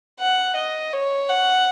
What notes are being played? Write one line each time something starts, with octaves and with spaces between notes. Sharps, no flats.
F#5
D#5
C#5
F#5